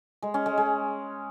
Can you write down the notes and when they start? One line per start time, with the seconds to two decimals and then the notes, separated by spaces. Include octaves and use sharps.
0.22 G#3
0.34 C#4
0.46 G#3
0.57 G#3